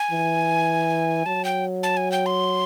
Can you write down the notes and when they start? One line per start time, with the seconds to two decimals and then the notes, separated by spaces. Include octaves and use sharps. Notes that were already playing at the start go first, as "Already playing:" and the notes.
Already playing: G#5
0.11 E3
1.26 F#3 A5
1.45 G5
1.83 A5
1.97 G#5
2.12 G5
2.26 C6